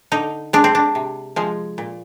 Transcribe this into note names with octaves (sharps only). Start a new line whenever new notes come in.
D3 D#4
G#3 D4
C4
D4
C3
F3 G#3
A#2